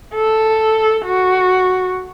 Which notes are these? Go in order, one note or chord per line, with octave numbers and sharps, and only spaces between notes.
A4
F#4